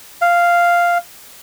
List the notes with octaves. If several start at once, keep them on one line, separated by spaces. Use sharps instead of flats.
F5